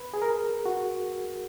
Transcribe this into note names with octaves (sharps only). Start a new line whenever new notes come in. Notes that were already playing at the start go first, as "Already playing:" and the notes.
Already playing: B4
G#4
A#4
F#4